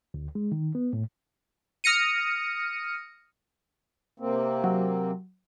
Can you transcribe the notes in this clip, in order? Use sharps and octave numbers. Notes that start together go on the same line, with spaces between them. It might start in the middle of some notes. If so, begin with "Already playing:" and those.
D2
G#3
D#3
B3
A2
D#6 F6 A#6 C#7 D#7
C3 A#3 C4
F#3